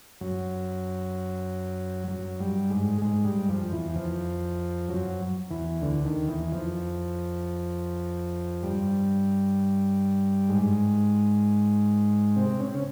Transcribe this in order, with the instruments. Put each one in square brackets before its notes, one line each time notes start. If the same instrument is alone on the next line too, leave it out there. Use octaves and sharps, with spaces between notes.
[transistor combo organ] F#2 F#3
F#2 F#3
G2 G3
G#2 G#3
G#2 G#3
G2 G3
F2 F3
E2 E3
F2 F3
F#2 F#3
E2 E3
D2 D3
D#2 D#3
E2 E3
F2 F3
G2 G3
G#2 G#3
C3 C4
C#4
C4
C#3 C#4